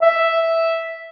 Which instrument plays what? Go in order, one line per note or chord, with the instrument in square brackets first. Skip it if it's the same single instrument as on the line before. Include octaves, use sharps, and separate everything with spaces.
[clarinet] E5